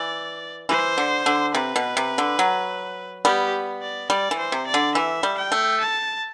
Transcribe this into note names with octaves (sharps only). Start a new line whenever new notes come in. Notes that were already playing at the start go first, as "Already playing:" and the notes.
Already playing: E3 D5
E3 C5
D3
D3
C3 B4
B2
C3
D3
F#3
G3 B3 G4
D5
G3 D5
E3
C5
C3
D5
D3
E3 E5
G3
G5
A3
A5